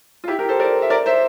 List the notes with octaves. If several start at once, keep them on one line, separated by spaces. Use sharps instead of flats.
F4
E4 G4
G4 A#4
A4 C5
A#4 D5
E5
A#4 D5
C5 E5